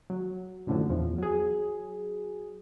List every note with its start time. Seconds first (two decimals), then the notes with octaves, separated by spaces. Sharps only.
0.10 F#3
0.67 F#2 A2 D3 F3 F#3
0.88 A#1 E2 F3
1.18 F#3 G#4